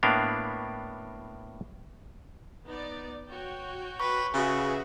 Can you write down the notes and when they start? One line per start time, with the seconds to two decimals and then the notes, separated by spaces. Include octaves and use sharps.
0.03 A2 A#3 B3 D4 F5
2.65 B3 D#4 D5
3.27 F#4 C#5 G5
4.00 B4 C#6
4.34 C#3 F#4 G#4 B4 E5